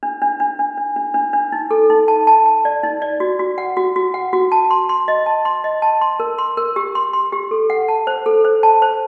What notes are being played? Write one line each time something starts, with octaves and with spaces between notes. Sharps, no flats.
D4
D4
D4
D4
D4
D4
D4
D4
D#4
A4
D#4
A5
A5
A5
D5
D#4
D5
F#4
F#4
F#5
F#4
F#4
F#5
F#4
A5
C6
C6
D#5
A5
C6
D#5
A5
C6
A#4
C6
A#4
G4
C6
C6
G4
A4
F#5
A5
C5
A4
C5
A5
C5